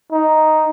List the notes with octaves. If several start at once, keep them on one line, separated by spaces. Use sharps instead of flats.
D#4